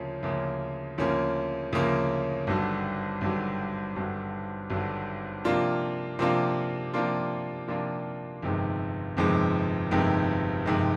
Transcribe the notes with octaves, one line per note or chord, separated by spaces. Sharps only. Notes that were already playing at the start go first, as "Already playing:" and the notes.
Already playing: D2 C#3 F3 A#3 C#4
D2 C#3 F3 A#3 C#4
D2 C#3 F3 A#3 C#4
D2 C#3 F3 A#3 C#4
G#1 G2 D3 F#3
G#1 G2 D3 F#3
G#1 G2 D3 F#3
G#1 G2 D3 F#3
C3 F3 A#3 D4 F4
C3 F3 A#3 D4 F4
C3 F3 A#3 D4 F4
C3 F3 A#3 D4 F4
G1 F2 C3 D#3 G#3
G1 F2 C3 D#3 G#3
G1 F2 C3 D#3 G#3
G1 F2 C3 D#3 G#3